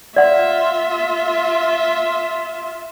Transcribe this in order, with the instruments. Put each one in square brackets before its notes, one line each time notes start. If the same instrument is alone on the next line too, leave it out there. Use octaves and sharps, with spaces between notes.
[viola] F4 E5 [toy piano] D5 F#5